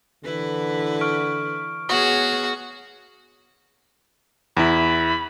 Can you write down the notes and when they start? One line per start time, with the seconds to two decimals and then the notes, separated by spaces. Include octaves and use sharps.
0.24 D3 E3 E4 B4
1.01 C#6 F6 D7
1.89 B3 F#4 G#4 C#5 D#6
4.57 E2 E4 B5